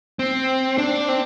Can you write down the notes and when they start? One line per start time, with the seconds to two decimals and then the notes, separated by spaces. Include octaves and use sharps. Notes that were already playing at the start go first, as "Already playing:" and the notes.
0.19 C4
0.78 D4
1.09 C4